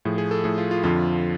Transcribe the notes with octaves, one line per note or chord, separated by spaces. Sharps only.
A2 F3 G#4
G#4
A4
A2 F3 G#4
F4
F4
F2 D3 F3 F4